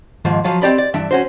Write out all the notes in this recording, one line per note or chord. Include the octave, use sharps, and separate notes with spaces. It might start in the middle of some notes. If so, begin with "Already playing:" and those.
D#2 G#2 F3
F3 F#3 F4
C4 G4 D5 B5
D5
G2 E3 D4 E5
C#4 F#4 C5